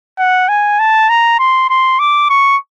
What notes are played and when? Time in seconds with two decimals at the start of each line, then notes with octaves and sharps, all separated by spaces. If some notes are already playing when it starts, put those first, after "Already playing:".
0.19 F#5
0.49 G#5
0.80 A5
1.10 A#5
1.39 C6
1.70 C6
1.99 D6
2.30 C#6